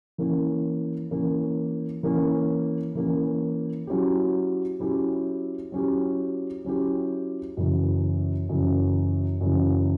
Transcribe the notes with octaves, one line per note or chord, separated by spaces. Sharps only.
E3 A#3 C#4
E3 A#3 C#4
E3 A#3 C#4
E3 A#3 C#4
F#3 C#4 E4 G4
F#3 C#4 E4 G4
F#3 C#4 E4 G4
F#3 C#4 E4 G4
F#2 C#3 E3
F#2 C#3 E3
F#2 C#3 E3